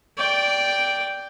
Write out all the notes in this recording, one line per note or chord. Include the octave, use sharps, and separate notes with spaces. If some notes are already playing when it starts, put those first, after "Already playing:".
D5 G5